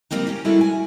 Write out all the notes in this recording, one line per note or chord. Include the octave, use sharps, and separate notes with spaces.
F3 G3 G#3 A#3 C4 D#4
C#4 G4
G3 G#3 D4 E4 F#4 A4
G#5